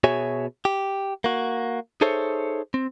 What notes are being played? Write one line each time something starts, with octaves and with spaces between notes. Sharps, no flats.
B2 F#4 G#4 C#5 E5 G#5
G4
A#3 F#4
D#4 G#4 A4 C5 C#5 E5
C4